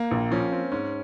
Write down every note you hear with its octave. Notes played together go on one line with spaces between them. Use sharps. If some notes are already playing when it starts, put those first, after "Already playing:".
Already playing: A#3
A#1
F3 C#4
C4
G#2 C#4